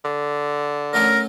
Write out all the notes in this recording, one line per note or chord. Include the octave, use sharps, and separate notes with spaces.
D3
F#3 A3 C#4 A#4